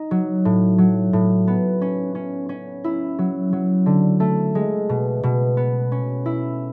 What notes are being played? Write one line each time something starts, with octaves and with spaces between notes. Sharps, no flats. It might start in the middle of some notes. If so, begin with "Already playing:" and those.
Already playing: D#4
F#3
A2
F#3
A2
B3
C#4
C#4
C#4
E4
F#3
F#3
D3
A3
G#3
B2
B2
B3
C#4
E4